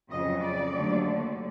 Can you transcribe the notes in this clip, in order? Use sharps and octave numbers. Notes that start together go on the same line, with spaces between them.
F2 C#3 F#3 D#5
D5
D#2 D3 F#3 A3